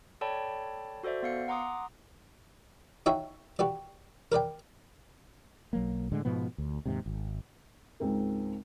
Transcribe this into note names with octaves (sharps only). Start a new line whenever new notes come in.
A4 C#5 D5 G5 A5 B5
F#4 A4 C5 D5 E5
B3 F5 C#7
F#5 A#5 C6 D6 D#6
D#4 F#4 C#5 E5 G5
F#4 G4 B4 D5
A#4 B4 D5 G5
B1 F#3 A#3
A2 D3 G#3
G#2 B2 F3 B3
D2
D#2 G#2 C3
G#1
C#2 G#2 C4 A#4